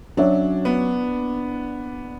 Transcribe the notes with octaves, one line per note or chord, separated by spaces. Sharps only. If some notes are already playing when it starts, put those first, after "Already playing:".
F#3 C#4 D4 F#4 C#5 E5
B3